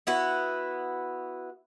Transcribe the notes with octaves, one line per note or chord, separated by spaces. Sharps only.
B3 E4 F#4